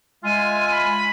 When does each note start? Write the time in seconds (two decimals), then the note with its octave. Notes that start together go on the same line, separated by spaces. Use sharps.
0.24 G#3 F4 E5 G#5
0.72 B5